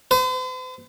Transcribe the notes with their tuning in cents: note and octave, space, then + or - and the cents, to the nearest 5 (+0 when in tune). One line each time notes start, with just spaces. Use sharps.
C5 -45